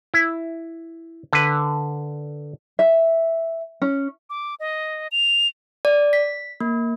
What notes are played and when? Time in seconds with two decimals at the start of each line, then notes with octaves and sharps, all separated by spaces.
0.14 E4
1.33 D3 B4
2.79 E5
3.82 C#4
4.30 D6
4.60 D#5
5.12 F7
5.85 D5
6.13 B6
6.60 A#3